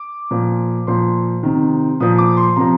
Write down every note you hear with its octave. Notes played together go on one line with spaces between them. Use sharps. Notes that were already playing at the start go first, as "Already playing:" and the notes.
Already playing: D6
A#2 F3
A#2 F3 C6
C3 D#3
A#2 F3 D#6
D6
C6
C3 F3 A#5